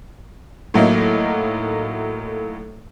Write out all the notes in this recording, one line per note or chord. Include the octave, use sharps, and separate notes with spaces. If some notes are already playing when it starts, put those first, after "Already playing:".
A2 F#3 A3 A#3 D#4